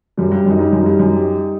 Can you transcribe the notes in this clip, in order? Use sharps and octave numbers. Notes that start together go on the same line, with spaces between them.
F#2 G3
G2
F#2
D#4
G2
F#2
G2 G3
F#2
G4